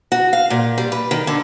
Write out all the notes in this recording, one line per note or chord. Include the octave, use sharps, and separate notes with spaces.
F#4
F5
A#2
G3
B4
D#3
D3